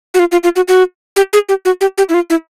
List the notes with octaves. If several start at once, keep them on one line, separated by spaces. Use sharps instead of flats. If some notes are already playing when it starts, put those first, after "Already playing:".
F#4
F4
F4
F4
F#4
F#4
G4
G#4
G4
F#4
G4
G4
E4
F4
E4